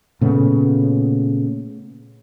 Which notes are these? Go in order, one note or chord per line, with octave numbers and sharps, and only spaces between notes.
A#2 C#3 A3 B3